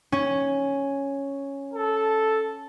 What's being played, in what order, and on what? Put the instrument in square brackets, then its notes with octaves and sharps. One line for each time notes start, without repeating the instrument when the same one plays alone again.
[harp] C#4
[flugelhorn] A4